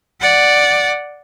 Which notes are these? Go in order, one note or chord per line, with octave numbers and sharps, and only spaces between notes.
D5 F#5